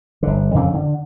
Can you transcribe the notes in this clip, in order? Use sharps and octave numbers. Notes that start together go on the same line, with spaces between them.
G1 D3
F2 C#3 A#3 C4
D3